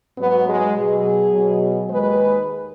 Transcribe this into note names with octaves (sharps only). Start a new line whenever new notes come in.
G#2 F#3 B3
G#3
B2 F#3 G#4
B2 F#3
D#2 D#3 G#3 B4